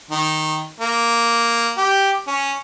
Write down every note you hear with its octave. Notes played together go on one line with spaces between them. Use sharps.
D#3
A#3
G4
C#4